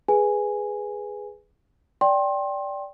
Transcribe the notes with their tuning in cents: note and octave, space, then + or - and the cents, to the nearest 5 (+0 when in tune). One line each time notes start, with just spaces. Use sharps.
G#4 +0 B4 +0 G#5 +0
D5 -15 G5 +0 C6 +30